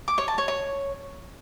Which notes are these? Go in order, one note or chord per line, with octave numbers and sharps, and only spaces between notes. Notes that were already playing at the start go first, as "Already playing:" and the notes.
D6
C#5
A5
C#5
C#5